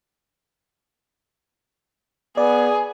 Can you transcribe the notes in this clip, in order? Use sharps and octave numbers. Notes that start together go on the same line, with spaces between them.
B3 G#4 D5